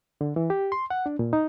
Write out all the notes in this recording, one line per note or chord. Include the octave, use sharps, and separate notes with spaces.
D3
E3
G4
C6
F#5
D4
A#2
D#4